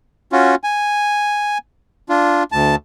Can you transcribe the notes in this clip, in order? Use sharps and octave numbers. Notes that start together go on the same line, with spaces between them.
C#4 F4 F#4
G#5
D4 F4
D2 A5